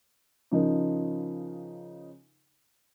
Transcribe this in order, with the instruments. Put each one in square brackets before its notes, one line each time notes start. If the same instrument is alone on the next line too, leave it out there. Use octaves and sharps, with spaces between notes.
[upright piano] C#3 F3 D#4 A#4